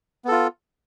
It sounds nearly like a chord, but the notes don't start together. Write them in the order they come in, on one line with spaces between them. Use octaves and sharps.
B3 A4 F4